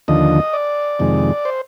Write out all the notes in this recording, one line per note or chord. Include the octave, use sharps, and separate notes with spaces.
D#2 D3 F3 D#5
D5
F2 C3 D#3 G#3
C5